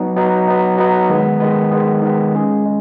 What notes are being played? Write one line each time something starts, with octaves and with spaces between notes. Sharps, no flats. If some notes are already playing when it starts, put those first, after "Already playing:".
Already playing: F#3 B3 D#4
F#3 B3 D#4
F#3 B3 D#4
F#3 B3 D#4
D#3 G#3 B3
D#3 G#3 B3
D#3 G#3 B3
D#3 G#3 B3
G#3 C#4 G#4
G#3